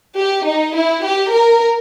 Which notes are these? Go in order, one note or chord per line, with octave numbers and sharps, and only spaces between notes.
G4
D#4
E4
G4
A#4